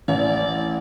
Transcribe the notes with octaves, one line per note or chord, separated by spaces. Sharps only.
A1 D5